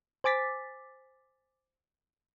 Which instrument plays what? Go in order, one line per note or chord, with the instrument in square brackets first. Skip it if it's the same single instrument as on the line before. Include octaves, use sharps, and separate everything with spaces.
[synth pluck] C5 G#5 D6 A6 B6